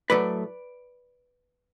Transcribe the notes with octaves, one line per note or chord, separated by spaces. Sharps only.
A2 F#3 A3 B4 D5